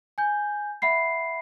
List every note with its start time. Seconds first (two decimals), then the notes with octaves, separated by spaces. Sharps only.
0.18 G#5 G6
0.82 E5 F#5 B5 C7